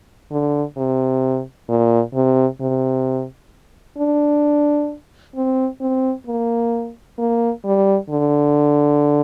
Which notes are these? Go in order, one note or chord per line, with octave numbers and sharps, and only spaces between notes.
D3
C3
A#2
C3
C3
D4
C4
C4
A#3
A#3
G3
D3